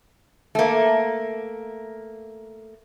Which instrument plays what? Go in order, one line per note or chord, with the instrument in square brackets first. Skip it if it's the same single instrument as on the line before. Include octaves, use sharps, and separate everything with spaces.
[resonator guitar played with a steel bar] A3 A#3